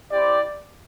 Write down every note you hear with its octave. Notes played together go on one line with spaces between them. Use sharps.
C4 E4 G4 D5